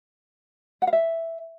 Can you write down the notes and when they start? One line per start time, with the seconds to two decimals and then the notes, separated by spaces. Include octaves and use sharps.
0.82 F#5
0.87 F5
0.93 E5